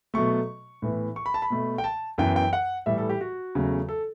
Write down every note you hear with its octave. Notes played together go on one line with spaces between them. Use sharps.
B2 F#3 A3 C#6
A2 E3 B3
C#6
B5
A5
B5
B2 A3
G5
A5
F#2 E3 B3 G5
G5
F#5
A2 E3 G3 E5
A4
G4
F#4
E2 C#3 F#3 A3
A4